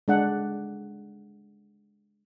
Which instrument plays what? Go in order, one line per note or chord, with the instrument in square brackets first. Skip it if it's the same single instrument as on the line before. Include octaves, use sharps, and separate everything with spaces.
[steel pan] G#3 D4 F#5